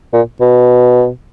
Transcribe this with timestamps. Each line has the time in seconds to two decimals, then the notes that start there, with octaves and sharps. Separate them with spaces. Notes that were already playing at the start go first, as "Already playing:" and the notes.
0.13 A#2
0.40 B2